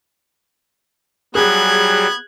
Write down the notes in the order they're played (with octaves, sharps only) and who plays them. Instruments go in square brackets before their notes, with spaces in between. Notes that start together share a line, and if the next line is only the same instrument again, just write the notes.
[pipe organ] F#3 G3 [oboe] B3 [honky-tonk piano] G#4 [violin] F#6 G#6